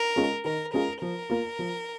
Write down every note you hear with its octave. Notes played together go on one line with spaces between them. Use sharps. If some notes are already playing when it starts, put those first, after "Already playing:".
Already playing: A#4
G#3 C#4 F4 G#4
D#3 A#4
G#3 C#4 F4 G#4 A#4
F3 A#4
A#3 F4
F3